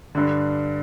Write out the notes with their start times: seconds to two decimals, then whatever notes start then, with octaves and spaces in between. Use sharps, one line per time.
0.15 G2 D3